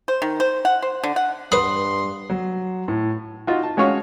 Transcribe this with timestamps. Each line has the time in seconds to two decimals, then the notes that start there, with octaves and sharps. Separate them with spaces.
0.08 C5
0.22 D#3
0.40 C5
0.65 F#5
0.82 C5
1.04 D3
1.16 F#5
1.52 G2 B4 B5 C6 D#6
2.30 F#3
2.88 A2
3.47 D#4 F4 F#4
3.63 A5
3.77 G#3 C#4 F#4 C#5 F5